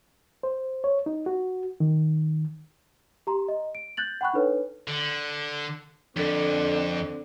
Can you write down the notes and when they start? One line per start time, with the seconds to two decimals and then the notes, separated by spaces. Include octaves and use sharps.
0.43 C5
0.84 C#5
1.06 D#4
1.26 F#4
1.80 D#3
3.27 G4 A#5 C6
3.48 D#5
3.75 D7
3.97 F#6 G6 A6 F#7
4.21 F#5 G5 B5 C#6 F#6
4.34 D4 D#4 A4 B4 C#5
4.88 D3
6.16 F2 D3 C4